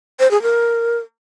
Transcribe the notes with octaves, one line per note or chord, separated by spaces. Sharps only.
C5
G#4
A#4